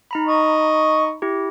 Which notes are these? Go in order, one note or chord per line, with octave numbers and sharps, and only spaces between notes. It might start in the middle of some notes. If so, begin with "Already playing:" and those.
D#4 A#5 B5
D#5 C#6
E4 G4